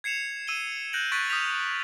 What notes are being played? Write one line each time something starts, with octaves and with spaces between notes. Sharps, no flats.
G#6 C7 C#7 E7 F7
E6 D#7 E7 G7
F#6 G6 A#6 D7 F#7
C#6 F#6 A6 B6 D7
D#6 F6 G6 B6 F7